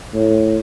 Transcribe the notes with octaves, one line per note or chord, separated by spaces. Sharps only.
A2